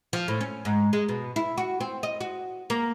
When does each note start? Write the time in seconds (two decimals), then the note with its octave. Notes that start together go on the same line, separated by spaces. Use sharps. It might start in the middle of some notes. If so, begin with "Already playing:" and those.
0.13 F3
0.28 A2
0.41 C#4
0.65 G#2
0.93 G#3
1.09 B2
1.36 E4
1.58 F#4
1.80 C4
2.03 D#5
2.21 F#4
2.70 A#3